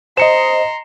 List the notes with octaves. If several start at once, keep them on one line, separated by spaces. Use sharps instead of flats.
C5 D#5 A#5 C6 C#7 E7